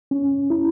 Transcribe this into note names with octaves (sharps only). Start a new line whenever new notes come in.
C#4
E4